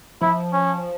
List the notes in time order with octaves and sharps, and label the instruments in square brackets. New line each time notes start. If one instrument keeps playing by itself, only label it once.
[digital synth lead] F3 [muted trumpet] E4
[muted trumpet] C#4